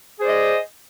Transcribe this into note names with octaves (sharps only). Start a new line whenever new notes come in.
G#4 C5 D5 D#5